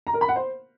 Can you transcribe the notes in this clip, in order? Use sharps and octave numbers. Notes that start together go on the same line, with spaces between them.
A#5
A#4
B5
F#5
C5